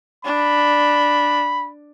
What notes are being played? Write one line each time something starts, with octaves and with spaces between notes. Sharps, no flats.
D4 B5